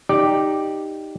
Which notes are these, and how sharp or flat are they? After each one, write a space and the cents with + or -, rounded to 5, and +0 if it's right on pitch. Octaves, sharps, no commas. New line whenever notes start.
D#4 +0 G4 +0 D5 +0